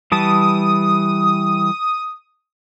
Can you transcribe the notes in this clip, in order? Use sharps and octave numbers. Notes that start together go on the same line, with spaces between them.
E3 G3 A5 D#6